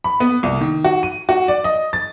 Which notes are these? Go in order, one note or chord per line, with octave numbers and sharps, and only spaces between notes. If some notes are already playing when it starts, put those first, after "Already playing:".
B5
B3
C2
D#3
F#4
D#7
F#4
D5
D#5
A6